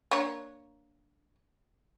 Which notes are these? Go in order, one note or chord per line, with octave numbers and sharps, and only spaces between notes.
A#3 D4 C#5